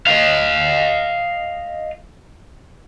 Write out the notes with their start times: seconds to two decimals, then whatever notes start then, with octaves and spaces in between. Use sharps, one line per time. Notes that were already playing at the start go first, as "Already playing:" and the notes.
0.07 D#5 F5